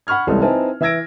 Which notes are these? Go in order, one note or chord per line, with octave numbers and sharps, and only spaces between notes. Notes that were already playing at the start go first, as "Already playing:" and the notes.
F#5 B5 C#6 F6 G#6
D#1 C2 E3 G#3 A4
C4 D#4 E4 B4 G#5 A5
E3 E5 E6 G#6 A#6 D7